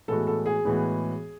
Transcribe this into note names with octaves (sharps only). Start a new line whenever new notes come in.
A2 E3 G#3 B3 F#4 A4
A4
G#4
A2 E3 G#3 B3 F#4